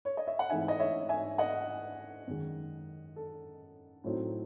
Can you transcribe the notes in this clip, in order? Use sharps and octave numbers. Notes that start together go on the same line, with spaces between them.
C#5
D#5
E5
F#5
G#2 E3 A3 C4 D#4 E5 G#5
D#5
C#5 E5
E5 G#5
D#5 F#5
F#2 D#3 G#3
A4
A2 F#3 A3 C4 D#4